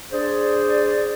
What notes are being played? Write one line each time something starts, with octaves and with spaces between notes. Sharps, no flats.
D4 G#4 C5 D5